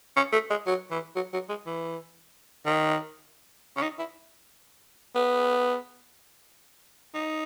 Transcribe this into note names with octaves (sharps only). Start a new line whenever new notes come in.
C#4
A3
G#3
F#3
E3
F#3
F#3
G#3
E3
D#3
C#4
D#4
E4
B3
D#4